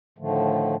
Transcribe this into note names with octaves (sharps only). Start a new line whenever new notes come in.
A2 D3 D#3 F3 A3